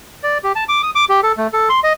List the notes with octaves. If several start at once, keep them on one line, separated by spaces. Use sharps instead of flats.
D5
G4
A5
D6
D#6
D6
G4
A4
A3
A4
C6
D#5